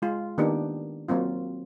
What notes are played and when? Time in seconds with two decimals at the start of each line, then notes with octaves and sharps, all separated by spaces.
0.02 G#3 F4
0.38 D#3 A#3 B3 D4 D#4 G4
1.08 F#3 A#3 C4 F4